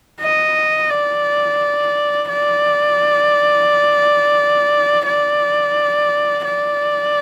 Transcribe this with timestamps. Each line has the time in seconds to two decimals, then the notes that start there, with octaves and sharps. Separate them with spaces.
0.21 D#5
0.90 D5
2.29 D5
5.06 D5
6.44 D5